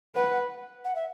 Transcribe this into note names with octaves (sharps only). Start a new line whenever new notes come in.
B4 F#5
F#5
E5